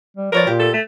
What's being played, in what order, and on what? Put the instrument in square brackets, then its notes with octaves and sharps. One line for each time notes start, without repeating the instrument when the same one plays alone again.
[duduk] G3
[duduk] F3 [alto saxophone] A#4 [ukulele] B4 C#5 D5
[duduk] A#2 [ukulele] G4
[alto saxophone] A4
A3